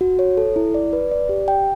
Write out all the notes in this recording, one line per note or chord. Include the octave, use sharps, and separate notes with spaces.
F#4
C#5
A4
E4
D5
B4
D5
G4
G5